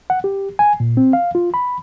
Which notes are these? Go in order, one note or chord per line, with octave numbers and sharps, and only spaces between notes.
F#5
G4
G#5
A#2
C4
F5
F4
B5